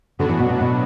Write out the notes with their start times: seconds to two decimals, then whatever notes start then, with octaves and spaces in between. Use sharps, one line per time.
0.19 A2 D3 F#3 B3 D4 F#4
0.29 E3
0.40 B2
0.50 B2
0.61 B2